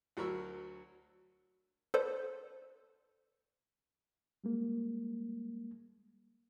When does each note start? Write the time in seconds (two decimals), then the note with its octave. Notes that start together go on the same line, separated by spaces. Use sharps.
0.17 D2 F#3 A#4 B5 C#6 E6
1.94 A4 B4 C5 D5
4.44 G3 G#3 A#3